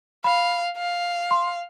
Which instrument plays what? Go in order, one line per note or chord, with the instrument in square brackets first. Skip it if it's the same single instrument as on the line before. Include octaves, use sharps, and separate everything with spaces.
[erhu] F5 [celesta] B5
[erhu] F5
[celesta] C6